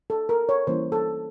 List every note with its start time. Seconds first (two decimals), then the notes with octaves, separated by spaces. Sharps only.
0.10 A4
0.29 A#4
0.49 C#5
0.67 E3 G3 A#3 C#4 C5
0.92 A4